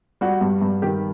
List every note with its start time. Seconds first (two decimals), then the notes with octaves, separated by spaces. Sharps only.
0.21 G3 F#4
0.41 G2
0.62 G2
0.82 D#3 G4